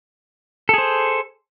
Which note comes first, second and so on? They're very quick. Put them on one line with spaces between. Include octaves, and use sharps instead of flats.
A4 G#4 C5